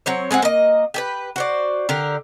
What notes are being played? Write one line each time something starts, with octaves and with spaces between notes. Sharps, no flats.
F#3 C4 C#5
G#3 C4 G#4 F#5
A#3 D#5
G4 G#4 B4
F#4 C5 D5
D3 G4 A#4